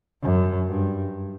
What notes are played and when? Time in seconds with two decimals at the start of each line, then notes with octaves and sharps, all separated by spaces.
0.22 F#2
0.68 G2